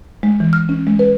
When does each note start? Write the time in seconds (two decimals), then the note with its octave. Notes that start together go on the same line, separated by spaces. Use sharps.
0.23 G#3
0.40 E3
0.53 F6
0.69 C#4
0.87 G#3
0.99 B4